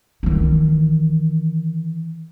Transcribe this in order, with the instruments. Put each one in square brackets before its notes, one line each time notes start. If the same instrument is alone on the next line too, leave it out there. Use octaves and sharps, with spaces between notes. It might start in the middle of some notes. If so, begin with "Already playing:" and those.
[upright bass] D#3 E3